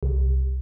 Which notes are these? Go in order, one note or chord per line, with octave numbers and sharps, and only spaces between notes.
C2